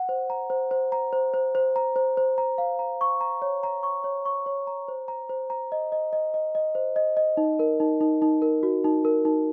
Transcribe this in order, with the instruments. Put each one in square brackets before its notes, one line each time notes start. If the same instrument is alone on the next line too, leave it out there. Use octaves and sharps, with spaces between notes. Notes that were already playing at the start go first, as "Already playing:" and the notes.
Already playing: [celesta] F#5
C5
A#5
C5
C5
A#5
C5
C5
C5
A#5
C5
C5
A#5
F5
A#5
C#6
A#5
C#5
A#5
C#6
C#5
C#6
C#5
A#5
C5
A#5
C5
A#5
D#5
D#5
D#5
D#5
D#5
C5
D#5
D#5
D#4
A#4
D#4
D#4
D#4
A#4
F#4
D#4
A#4
D#4